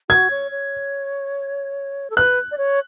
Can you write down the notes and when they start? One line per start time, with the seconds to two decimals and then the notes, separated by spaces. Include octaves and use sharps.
0.09 F#4 G#6
0.30 C#5
0.51 C#5
2.10 A4
2.17 B4 F#6
2.51 D5
2.58 C#5